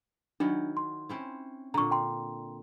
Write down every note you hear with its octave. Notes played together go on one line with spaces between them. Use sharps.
D#3 F#3 D4 E4
C6
C4 C#4 E4
A#2 D3 A#5 C#6
G5 A#5 C6